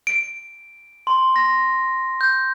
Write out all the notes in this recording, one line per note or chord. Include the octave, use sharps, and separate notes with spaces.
D7
C6
A#6
G6